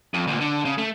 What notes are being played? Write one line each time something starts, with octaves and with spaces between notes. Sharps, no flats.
F2
D2 A#2
D3
C#3
A3